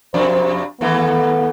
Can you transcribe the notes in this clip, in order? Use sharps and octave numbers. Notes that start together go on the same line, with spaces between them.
F2 C3 D4 C5
D#2 E3 A3 B3